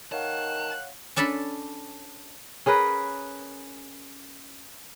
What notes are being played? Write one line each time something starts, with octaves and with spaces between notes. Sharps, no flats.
D#3 C#5 F5 F#5 A5 F#6
C#4 D4 A4 D5 B5
C#4 G#4 A#4 B4